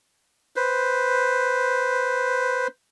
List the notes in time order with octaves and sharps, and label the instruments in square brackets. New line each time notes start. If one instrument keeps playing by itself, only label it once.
[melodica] B4 C5